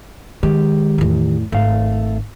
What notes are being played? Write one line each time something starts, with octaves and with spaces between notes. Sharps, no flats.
D#3 G#3 G4
E2 A2
G#1 A3 F5